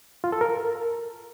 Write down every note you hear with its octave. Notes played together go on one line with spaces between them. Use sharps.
F4
A4
A#4